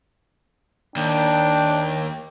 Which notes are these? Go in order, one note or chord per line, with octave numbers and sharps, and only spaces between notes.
D#2 D4 G5